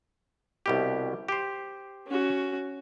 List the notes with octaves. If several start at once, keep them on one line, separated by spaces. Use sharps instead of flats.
C2 B2 G4
G4 C5
C#4 F#4